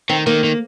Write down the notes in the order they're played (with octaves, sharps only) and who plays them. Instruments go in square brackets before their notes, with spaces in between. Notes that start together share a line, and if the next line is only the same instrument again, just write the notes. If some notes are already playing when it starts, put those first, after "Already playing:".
[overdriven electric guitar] D#3 [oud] C4
[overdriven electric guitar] D#3 [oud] A#3
[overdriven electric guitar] D#3